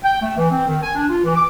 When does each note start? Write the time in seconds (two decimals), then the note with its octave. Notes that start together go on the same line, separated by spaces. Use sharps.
0.04 G5
0.22 A3
0.38 E3
0.51 C4
0.68 D#3
0.83 G#5
0.96 D4
1.09 F4
1.24 E3
1.36 D6